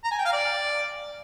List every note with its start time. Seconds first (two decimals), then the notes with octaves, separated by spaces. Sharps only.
0.04 A#5
0.11 G#5
0.18 G5
0.25 F5
0.32 D5